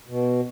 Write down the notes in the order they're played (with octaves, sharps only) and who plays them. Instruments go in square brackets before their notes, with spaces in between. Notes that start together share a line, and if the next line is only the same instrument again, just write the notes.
[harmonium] B2